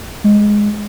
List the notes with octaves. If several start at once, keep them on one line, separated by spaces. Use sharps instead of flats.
G#3